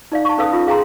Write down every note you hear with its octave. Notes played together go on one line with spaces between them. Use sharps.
D#4 D5 F5
A5 C#6
C#4 A4 B4 F5 D#6
F4
G#4 F5 G5 G#5 A#5 C6